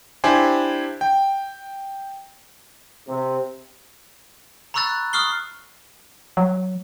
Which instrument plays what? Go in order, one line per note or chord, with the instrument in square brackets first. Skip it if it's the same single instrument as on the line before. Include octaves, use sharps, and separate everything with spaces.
[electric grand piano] D4 E4 G4 C5 G#5
G5
[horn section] C3
[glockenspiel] A#5 B5 C#6 E6 F#6 A6
C#6 D#6 F6 C7 G7
[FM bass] F#3